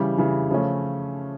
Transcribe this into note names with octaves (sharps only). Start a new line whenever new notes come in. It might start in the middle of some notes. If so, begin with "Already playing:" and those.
Already playing: C#3 E3 G3
C#3 E3 G3
C#3 F3 A3 C#4